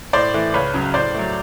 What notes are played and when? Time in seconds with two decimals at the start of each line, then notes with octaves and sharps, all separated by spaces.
0.13 A2 C5 D5
0.34 E3 A3
0.54 C#2 B4 C#5
0.74 C#3 F#3
0.94 A2 C5 D5
1.15 F#3 A3